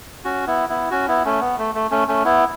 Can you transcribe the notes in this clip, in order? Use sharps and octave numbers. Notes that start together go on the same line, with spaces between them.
C#4 F#4
B3 E4
B3 E4
C#4 F#4
B3 E4
A3 C#4
B3
A3
A3
A3 C#4
A3 C#4
B3 E4